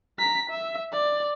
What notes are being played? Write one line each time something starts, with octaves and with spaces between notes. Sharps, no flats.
A#5 B6
E5
D5